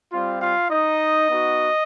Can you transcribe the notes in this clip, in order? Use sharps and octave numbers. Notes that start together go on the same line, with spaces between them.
G3 C4 F4
F4 F5
D#4 D#5
B3 D#4 F#4